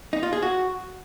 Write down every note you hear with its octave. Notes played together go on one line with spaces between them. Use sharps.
D#4
F4
G#4
F#4